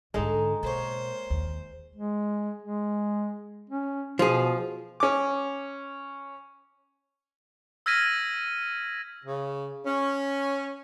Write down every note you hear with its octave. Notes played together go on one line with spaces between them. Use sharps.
G#2 D3 G#3 D#4 A4 A5
B2 A#3 C5 C#5
D#2
G#3
G#3
C#4
B2 F3 G#4
C#4 D6
E6 F6 G#6 A#6 B6 D#7
C#3
C#4